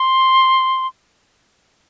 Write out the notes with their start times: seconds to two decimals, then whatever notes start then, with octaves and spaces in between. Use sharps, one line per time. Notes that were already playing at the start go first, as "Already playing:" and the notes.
Already playing: C6